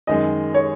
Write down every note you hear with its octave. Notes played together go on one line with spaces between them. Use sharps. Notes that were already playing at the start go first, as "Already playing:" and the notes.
F#2 D#3 G#3 D#5
C#5